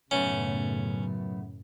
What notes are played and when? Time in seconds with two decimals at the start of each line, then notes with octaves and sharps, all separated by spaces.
0.11 B1 F#2 A2 C#3 A3 B3 C#4